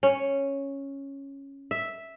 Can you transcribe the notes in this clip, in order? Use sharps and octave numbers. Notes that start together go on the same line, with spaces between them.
C#4
E5